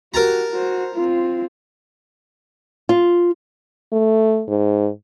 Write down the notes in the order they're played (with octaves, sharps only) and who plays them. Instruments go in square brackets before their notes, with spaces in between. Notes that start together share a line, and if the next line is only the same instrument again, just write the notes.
[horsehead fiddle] F#4 G4 [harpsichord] A#4 A5 A#5
[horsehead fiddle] F#4 C5
C4 F4
[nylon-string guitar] F4
[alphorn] A3
G#2